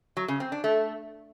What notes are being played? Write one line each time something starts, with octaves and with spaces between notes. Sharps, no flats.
F#3
C#3
C4
D4
A3